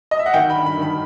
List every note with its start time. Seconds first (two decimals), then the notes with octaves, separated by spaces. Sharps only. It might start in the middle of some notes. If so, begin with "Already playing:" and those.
0.11 D#5
0.19 E5
0.26 F#5
0.34 D#3 G5
0.50 B5
0.55 G2
0.66 B5
0.77 D#3
0.82 B5